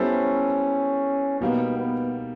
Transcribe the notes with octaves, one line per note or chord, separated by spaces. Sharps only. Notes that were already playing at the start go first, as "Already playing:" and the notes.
Already playing: G3 B3 C#4 E4 A4 C5
B2 G3 A#3 B3 D#4
B3